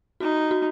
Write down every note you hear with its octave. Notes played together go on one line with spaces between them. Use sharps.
D#4 F#4
F#4